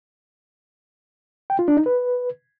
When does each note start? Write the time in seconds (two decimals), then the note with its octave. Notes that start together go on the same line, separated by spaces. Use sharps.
1.50 G5
1.59 F4
1.68 D4
1.77 D#4
1.86 B4